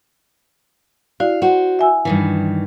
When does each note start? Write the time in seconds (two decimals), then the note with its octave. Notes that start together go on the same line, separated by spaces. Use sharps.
1.20 E4 F#4 D5 F5
1.42 F#4 C5 F#5
1.79 E5 G#5 E6
2.05 G2 D#3 E3